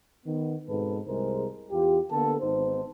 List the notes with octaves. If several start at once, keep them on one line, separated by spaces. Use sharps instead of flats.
D#3 B3
G#2 B2 C4 A4 B4
C2 G#3 G#4 A#4 C5
E2 F4 G4
D3 A#3 B3 A4
G#1 B3 D#4 C5